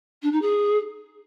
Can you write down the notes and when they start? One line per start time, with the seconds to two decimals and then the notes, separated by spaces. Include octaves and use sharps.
0.22 D4
0.31 D#4
0.41 G#4